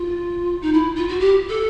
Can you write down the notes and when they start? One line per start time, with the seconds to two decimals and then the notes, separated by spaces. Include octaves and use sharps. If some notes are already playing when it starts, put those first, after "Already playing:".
Already playing: F4
0.61 D#4
0.73 E4
0.96 F4
1.08 F#4
1.19 G4
1.49 A4